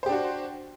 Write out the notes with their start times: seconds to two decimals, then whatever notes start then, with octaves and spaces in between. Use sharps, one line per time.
0.03 C5
0.06 G4
0.09 D4
0.12 F#4